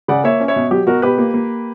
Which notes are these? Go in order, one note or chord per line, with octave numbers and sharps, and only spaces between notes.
C#3 D5 F#5
A#3 C#5 E5
C#4
C#5 E5
B2
F#3 G4
B2 F#4 A#4
B2 G4 B4
A#3
A#3